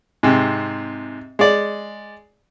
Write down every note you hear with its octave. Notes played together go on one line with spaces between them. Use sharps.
G#2 C3
G#3 D5